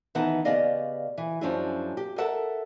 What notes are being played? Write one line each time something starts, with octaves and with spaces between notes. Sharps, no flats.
D#3 E3 B3 D#4 F#5 A5
C#3 B3 G4 D5 D#5 F5
E3
F#2 F3 C#4 D4 E4 G#4
G4
A4 A#4 E5 F#5 A5